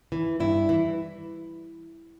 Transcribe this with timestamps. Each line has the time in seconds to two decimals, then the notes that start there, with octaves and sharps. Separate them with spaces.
0.12 E3
0.40 G2 E4
0.69 E3